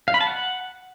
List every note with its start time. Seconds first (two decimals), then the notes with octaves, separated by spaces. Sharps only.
0.08 F5
0.14 B5
0.21 A5
0.27 F#5